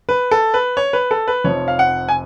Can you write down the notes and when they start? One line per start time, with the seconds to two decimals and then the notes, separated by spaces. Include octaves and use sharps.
0.09 B4
0.31 A4
0.54 B4
0.77 C#5
0.93 B4
1.11 A4
1.28 B4
1.44 F1 F2 F3 C#5
1.68 F5
1.79 F#5
2.09 G#5